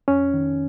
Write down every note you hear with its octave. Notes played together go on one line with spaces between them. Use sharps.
F2 C#4
D#3